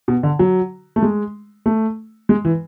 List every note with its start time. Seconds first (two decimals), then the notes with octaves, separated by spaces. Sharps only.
0.08 B2
0.23 D3
0.39 F#3
0.96 A3
1.02 G#3
1.66 A3
2.29 G#3
2.45 E3